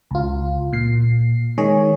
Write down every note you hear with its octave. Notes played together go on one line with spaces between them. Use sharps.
C#2 F4
A#2 C7
D#3 G#3 G#4 C#5